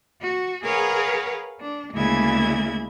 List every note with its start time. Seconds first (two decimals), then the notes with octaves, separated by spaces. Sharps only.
0.22 F#4
0.63 G#4 A#4 B4 C#5 F5 F#5
1.60 D4
1.93 D2 C#3 G#3 A#3 E4 G#6